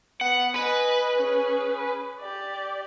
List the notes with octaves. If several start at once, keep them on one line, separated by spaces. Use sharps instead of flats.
B3 F#5
B4 D#5 G#5
C#4 G#4
G4 D5